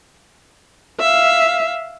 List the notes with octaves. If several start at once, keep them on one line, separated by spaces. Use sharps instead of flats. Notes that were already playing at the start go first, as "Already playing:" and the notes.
E5 F5